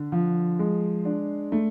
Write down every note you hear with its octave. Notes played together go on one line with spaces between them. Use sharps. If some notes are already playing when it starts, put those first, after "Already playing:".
Already playing: D3
F3
G#3
D4
A3